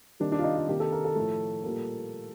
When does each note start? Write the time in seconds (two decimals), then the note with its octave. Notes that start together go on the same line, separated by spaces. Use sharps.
0.20 C3 D#3 G3 A#3 D4
0.32 D4
0.39 F4
0.44 D#4
0.56 F4
0.68 C3 D#3 A#3 G4
0.80 A4
0.92 A#4
1.05 A4
1.15 A2 F3 A3
1.64 A#2 G3 A#3